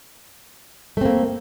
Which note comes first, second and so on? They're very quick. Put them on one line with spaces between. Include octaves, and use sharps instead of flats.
A3 C4 A#3